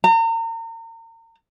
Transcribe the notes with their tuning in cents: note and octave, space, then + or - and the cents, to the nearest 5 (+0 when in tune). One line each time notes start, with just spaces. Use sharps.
A#5 -35